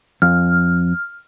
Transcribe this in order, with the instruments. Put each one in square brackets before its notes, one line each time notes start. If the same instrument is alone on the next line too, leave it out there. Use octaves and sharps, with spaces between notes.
[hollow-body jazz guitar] F2 [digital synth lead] F6